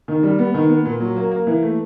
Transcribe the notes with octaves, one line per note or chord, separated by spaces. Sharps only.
D#3
G3
B3
D#3
B3
A#2
F#3
A#3
A#3
E3
A3